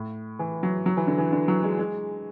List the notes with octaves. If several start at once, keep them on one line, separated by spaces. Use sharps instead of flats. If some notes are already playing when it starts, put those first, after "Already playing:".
Already playing: A2
E3
F#3
F#3
E3
D3
E3
D3
F#3
G#3
G#3